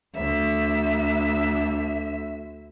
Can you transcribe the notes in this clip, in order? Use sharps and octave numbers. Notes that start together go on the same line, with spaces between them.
D2 E5